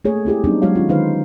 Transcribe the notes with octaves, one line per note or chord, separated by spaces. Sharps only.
A3 A#3 G#4 C#5
C4 E4 G4 G#4
F#3 G3 B3 C4 D4 D#4
F#3 G#3 F#4 C#5 F5
D#3 C#4 F4
D3 D#3 D#4 B4 C5 F5